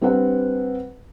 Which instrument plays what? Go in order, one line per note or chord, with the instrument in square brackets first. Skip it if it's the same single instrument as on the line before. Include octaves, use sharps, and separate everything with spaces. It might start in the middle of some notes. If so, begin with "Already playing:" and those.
[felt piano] G3 C4 D4 B4 F#5